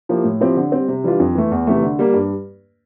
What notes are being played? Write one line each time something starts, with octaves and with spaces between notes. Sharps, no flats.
F3 A#3 E4 G4
A2
F3 C4 E4 G4
D3
G3 C4
C3
E3 G3 D4 F4
F2
E3 A3
E2
C3 E3 A3
D3
G3 A#3
G2